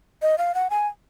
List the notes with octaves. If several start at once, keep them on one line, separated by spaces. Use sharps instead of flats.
D#5
F5
F#5
G#5